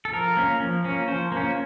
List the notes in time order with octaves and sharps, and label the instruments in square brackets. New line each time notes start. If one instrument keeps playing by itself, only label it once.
[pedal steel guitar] A4
F3 A#4
A#3 C#4
F3
A#3 C#4
F3 C5
A#3 C#4